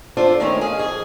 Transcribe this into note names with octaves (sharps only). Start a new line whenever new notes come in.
D4 F4 A4 C5
D#3 A3 A#3 C4 C#4
G#4 D#5 F5
F2 G#4